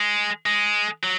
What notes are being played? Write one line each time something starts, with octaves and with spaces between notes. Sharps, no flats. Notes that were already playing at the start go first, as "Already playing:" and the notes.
Already playing: G#3
G#3
F#3